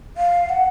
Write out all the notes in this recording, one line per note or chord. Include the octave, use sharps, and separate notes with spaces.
F5
F#5